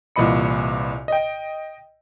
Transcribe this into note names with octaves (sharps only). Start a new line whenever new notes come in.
C2 A#2 E3 D#5 B5 C#7
D#5 G5